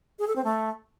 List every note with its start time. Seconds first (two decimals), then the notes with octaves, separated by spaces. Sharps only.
0.19 G#4
0.27 A4
0.36 C4
0.44 A3